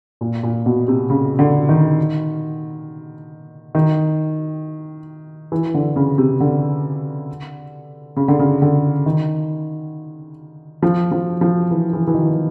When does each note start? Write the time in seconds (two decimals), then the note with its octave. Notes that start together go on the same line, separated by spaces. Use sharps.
0.21 A#2
0.43 A#2
0.66 B2
0.88 C3
1.10 C#3
1.39 D3
1.69 D#3
3.75 D#3
5.52 E3
5.74 D3
5.96 C#3
6.18 C3
6.40 D3
8.16 C#3
8.28 D3
8.39 C#3
8.62 D3
9.06 D#3
10.82 F3
11.11 F3
11.41 F3
11.71 E3
11.93 E3
12.08 E3
12.15 D#3